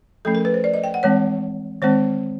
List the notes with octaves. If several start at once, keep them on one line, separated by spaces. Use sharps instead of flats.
F3 A3 C#4 A4
A#4
B4
C5
D5
D#5
G5
F#5
E3 G#3 C4 C#5
D#3 G#3 C4 C5